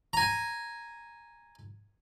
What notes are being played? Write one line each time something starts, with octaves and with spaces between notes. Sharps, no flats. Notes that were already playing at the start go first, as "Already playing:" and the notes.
G#5 A#5